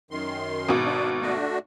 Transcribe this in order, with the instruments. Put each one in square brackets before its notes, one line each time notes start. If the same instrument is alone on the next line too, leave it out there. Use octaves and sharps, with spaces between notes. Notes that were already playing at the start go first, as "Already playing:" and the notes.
[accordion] F#2 D#3 C6
[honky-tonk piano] G#1 B2
[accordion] D4
A3 D4 F#4